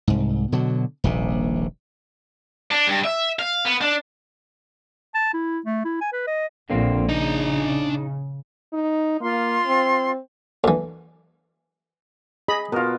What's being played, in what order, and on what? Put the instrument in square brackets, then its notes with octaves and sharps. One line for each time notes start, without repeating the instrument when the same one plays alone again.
[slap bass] C2 G#2
B2 D3 F#3
D#1 A#1 C3
[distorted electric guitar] D4
G2
E5
F5
B3
D4
[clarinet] A5
E4
A3
E4
G#5
B4
D#5
[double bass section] A#1 [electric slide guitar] D3 A#3 C4
[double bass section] C#3 [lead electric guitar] D4 A#5 [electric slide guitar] D#4
[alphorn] D#4
[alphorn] A#3 [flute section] F4 C6
[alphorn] C4
[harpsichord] D2 E3
[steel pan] G#4 D#5 B5
[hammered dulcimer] B2 F4 [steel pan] A#4